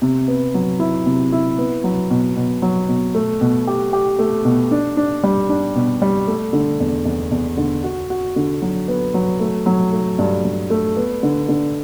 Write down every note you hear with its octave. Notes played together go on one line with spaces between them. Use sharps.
C3
B3
F#3
E4
C3
E4
B3
F#3
B2
B2
F#3
B2
A3
B2
G4
G4
A3
B2
D4
D4
G3
D4
B2
G3
A3
D3
E2
E2
E2
D3
F#4
F#4
D3
F#3
B3
F#3
A3
F#3
A3
G2
G2
A3
B3
D3
D3